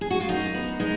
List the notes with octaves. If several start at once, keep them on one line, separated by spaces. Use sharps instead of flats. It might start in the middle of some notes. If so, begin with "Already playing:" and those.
G#4
F#4
F4
F#2 D#4
B3
G#3 D#4